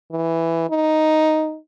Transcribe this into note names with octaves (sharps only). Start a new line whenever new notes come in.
E3
D#4